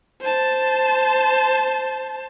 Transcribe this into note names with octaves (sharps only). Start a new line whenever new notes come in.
C5 A5